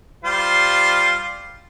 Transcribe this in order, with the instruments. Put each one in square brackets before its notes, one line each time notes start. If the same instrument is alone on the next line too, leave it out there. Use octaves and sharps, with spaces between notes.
[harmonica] G3 F4 C5